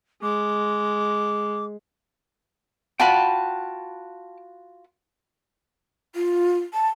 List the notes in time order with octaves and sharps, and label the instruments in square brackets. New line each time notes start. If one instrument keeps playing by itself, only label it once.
[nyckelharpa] G#3 [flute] D6
[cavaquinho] F4 F#4 B5 [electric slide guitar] G5 A5
[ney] F4
A5